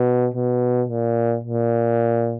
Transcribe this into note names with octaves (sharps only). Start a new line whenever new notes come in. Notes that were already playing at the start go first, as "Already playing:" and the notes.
Already playing: B2
B2
A#2
A#2